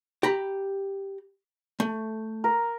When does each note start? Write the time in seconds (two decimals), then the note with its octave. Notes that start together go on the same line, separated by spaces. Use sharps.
0.23 G4 A#5 B5
1.80 A3
2.44 A#4